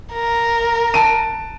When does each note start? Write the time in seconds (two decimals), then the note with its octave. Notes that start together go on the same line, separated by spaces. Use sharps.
0.13 A#4
0.94 A5 D7 D#7